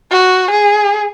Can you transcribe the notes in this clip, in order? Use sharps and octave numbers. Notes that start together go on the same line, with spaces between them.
F#4
G#4